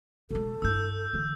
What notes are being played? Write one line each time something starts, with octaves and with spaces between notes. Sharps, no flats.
B2 G#3 A4
G2 E4 E6 G6
D3 E3